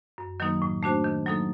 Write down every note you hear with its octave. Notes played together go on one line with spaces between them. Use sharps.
F#2
D#3 F#3 A#3 D#4
A2
A3 D4 F#4 C5
D#3
F#3 A#3 D#4 A4